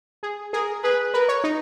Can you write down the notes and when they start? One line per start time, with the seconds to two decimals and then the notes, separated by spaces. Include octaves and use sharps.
0.23 G#4
0.53 G#4 A#4
0.83 G#4 B4
1.13 A#4 B4
1.28 C#5
1.44 D#4